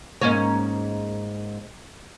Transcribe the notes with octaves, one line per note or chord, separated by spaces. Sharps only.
G#2 A#3 C#4